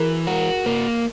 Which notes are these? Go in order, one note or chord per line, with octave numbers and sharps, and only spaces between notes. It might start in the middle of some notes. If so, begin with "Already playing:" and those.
Already playing: E3 F#4 G#4 A#4
F#4 A#4
A#3 A#4